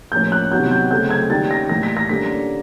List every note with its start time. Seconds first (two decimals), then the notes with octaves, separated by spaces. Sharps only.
0.12 A2 F3 A#3 C#4 G6
0.32 F#6
0.51 C3 D#3 F#3 B3 G6
0.71 G6
0.91 C#3 F#3 A3 C4 G6
1.11 G#6
1.30 D#3 G3 A#3 C#4 A6
1.51 A#6
1.69 A2 E3 G3 A#3 A#6
1.83 B6
1.97 A#6
2.09 D3 G3 A#3 C#4 B6